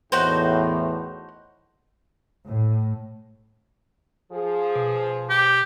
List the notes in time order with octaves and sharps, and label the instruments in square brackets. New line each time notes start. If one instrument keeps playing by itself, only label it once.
[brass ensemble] E2 A2 [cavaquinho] D#4 F#4 C5
[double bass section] A2
[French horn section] F3 G#4
[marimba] B2
[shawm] G4